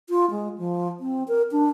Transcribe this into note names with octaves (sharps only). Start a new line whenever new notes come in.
F4
G#3
F3
C4
A#4
D4